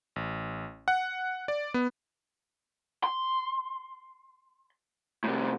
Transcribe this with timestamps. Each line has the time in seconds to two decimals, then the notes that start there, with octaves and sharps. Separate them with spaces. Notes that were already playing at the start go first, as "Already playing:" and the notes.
0.16 A1
0.88 F#5
1.48 D5
1.74 B3
3.04 C6
5.24 A2 C3